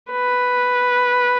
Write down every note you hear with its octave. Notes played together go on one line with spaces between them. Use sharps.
B4